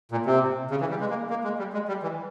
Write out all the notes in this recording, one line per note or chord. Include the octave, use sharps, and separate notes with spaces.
A#2
C3
C#3
E3
G3
G#3
A#3
A#3
G#3
G3
G#3
G3
E3